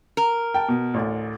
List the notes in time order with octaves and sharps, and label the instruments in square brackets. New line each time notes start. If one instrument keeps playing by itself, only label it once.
[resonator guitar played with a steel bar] A#4
[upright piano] G5 A5
B2
A1 D2